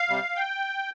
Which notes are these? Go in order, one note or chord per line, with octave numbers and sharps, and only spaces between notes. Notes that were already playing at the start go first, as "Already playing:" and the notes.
Already playing: F5
C3 G3
G5